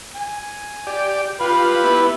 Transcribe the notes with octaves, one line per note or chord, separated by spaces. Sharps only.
G#5
G4 D5
F4 G4 B4 B5
B3 E4